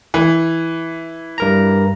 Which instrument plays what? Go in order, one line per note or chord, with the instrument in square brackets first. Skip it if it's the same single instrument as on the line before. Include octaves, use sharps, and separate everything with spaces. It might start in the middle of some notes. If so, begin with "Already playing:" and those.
[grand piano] E3
[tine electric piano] G2 A#4 A#5